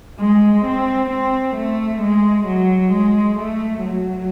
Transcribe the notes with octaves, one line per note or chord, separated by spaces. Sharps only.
G#3
C4
C4
A3
G#3
F#3
G#3
A3
F#3